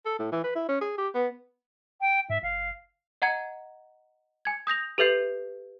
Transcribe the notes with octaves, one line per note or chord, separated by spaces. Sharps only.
A4
A2
E3
B4
E4
C#4
G#4
G4
B3
G5
G#2 E5
F#1 F5
D#5 F#5 A#5 G#6 C#7
G#5 G#6
D#6 G6 A#6 F7
G4 A4 B4 E5 G6 C7